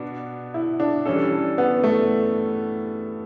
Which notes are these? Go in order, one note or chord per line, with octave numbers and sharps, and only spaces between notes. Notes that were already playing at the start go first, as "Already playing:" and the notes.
Already playing: B2 B3 D4
E4
D4
E3 G3 C#4 D4 A4
B3
A3